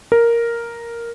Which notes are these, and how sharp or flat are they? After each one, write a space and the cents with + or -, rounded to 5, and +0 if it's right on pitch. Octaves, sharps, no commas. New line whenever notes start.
A#4 +0